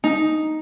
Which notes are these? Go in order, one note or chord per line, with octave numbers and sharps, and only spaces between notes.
D#4